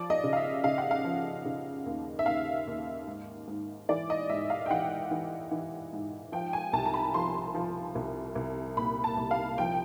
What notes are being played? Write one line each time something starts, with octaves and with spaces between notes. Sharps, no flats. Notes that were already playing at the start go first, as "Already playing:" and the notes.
Already playing: F3 D5
D#5
C#3
F5
E5
C#3 F5
F#5
F5
F3
C#3
D#2
E5
D#2 F5
D#2
G#2
G#2
E3 D5
D#5
G#2 E5
F5
G5
E3 F#5
E3
E3
G#2
F3 G5
G#5
C2 A5
A#5
B5
F3 C6
F3
C2
C2
A#2 B5
A5
C2
F5
F3 G5